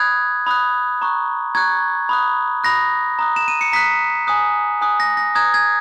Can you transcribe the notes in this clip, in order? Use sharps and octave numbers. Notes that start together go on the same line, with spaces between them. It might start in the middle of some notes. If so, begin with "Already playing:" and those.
Already playing: B5 D#6 F#6 G#6
B5 D#6 F#6
A#5 C#6 F#6
A#5 C#6 F#6 G#6
B5 D#6 F#6
B5 D#6 F#6 A#6
A#5 D#6 F#6
E7
D#7
C#7
A#5 D#6 F#6 B6
G#5 D#6 F#6
G#5 D#6 F#6
A#6
A#6
A#5 D#6 F#6 G#6
G#6